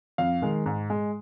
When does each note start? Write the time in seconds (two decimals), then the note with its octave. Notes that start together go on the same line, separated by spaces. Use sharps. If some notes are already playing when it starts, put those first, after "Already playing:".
0.18 F2 F5
0.42 D#3 G#3
0.66 G#2
0.90 G#3